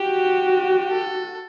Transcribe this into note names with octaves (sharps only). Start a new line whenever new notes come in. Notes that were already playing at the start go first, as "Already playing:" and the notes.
Already playing: F#4 G4
A4